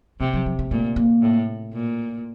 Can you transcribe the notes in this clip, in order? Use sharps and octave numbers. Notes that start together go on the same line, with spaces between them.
C3 A3
F#3
F#3
A3
A#2 A3
A#3
A2
A#2